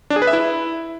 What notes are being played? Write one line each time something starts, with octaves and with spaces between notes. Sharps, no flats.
D4
G#4
B4
E5
E4